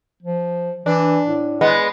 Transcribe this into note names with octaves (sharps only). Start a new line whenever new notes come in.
F3
E3 D4
A2
G#3 B3